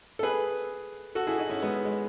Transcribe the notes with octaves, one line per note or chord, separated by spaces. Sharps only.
A4
G#4 B4
F#4 A4
E4 G#4
D#4 F#4
C#4 E4
G#3 B3
G#3